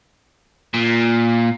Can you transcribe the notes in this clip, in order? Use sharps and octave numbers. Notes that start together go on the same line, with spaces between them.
A#2